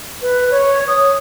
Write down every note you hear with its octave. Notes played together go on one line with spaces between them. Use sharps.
B4
C#5
D#6